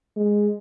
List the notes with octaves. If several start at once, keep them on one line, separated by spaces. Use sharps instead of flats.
G#3